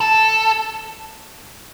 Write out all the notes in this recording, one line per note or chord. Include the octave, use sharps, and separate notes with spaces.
A4